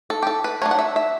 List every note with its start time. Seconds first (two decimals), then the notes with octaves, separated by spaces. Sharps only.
0.10 A4
0.23 G4
0.27 A4
0.44 B4
0.62 F#3 A3 D4 C#5
0.71 F#5
0.79 E5
0.96 E5